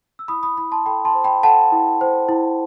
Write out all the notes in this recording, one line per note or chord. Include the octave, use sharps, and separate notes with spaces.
E6
E4 B5 D#6
B5 D#6
E4 B5 D#6
A5 C6
A4 G5 B5
A5 C6
C5
G5 B5
A4 F#5 A5
E4
C5
E4